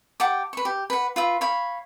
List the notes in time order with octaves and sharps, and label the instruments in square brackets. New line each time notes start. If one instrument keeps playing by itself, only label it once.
[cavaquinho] G4 F#5 A5 D6
B4 C#6
G4
B4 F#5
F4 B4 E5
C#5 F5 B5